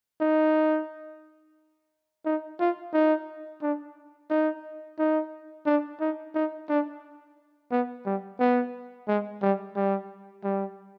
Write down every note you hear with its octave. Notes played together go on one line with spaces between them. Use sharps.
D#4
D#4
F4
D#4
D4
D#4
D#4
D4
D#4
D#4
D4
B3
G3
B3
G#3
G3
G3
G3